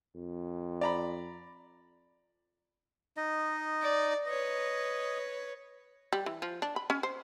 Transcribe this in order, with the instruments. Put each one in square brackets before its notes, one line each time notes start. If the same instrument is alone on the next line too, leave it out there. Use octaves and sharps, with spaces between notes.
[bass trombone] F2
[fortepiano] D5 A#5 B5
[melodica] D#4 D#5
[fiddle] D5
[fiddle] B4 C#5 [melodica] D#5
[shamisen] G3
E3
F3
D4
B5
C#4
C5